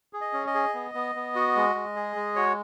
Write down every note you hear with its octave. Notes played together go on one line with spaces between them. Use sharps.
G#4
D#5
C#4
D#5
G#4
B3
B3
B3
F#4
G#3
G#3
G#4
G#3
F#4 C#5